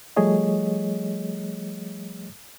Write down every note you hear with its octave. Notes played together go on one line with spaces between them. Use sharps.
F3 G3 A3 G#4 C#5 D#5